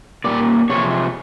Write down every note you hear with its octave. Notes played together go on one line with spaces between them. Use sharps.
A#2 G3 A#3 D5
C3 F3 G#3 C4 C#5